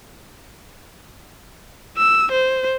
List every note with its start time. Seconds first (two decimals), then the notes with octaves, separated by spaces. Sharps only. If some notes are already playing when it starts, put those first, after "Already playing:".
1.97 E6
2.32 C5